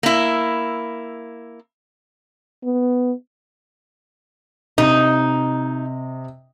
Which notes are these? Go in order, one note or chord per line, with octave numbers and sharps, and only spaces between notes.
A#3 E4
B3
C3 D#4 D#5